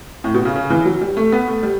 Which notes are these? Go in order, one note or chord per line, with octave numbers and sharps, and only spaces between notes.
A2
B2
C#3
C#3
E3
F#3
G3
A3
B3
A3
G3